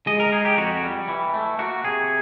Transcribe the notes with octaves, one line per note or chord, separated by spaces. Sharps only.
G#3 D#5
A#4
D#4 G#4
G4
F2 F#4
G3
E3
A3
A#3 F#4
C3 G#4